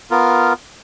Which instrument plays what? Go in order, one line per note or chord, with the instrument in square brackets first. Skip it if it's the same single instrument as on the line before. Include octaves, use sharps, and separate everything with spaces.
[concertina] B3 F4 A#4